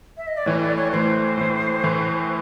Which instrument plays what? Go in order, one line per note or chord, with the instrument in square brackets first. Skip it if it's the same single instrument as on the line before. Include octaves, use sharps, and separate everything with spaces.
[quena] E5
D#5
D5
[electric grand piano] A2 E3 A3 [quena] C#5
[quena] D5
C#5
[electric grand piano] A2 E3 A3 [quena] C5
[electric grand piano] A2 E3 A3
A2 E3 A3